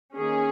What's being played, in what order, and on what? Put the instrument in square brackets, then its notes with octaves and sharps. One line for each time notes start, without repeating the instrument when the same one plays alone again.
[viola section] D#3 A#3 C#4 G#4